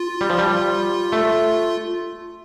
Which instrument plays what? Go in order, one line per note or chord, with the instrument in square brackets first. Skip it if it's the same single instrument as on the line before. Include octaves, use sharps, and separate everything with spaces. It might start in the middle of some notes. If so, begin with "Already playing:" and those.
Already playing: [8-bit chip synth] F4
[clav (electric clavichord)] G3
F3
G3
A3